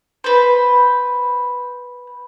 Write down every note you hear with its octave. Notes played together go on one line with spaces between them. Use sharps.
B4 C5